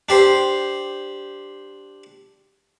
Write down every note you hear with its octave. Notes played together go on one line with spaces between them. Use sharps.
D4 G4 C5